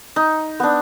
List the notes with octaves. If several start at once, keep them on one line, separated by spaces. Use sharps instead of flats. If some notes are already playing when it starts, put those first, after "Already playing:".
D#4
B3 D4